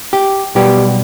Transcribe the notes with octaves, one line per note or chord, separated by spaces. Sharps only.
G4
B1 B2 G3 B3 G4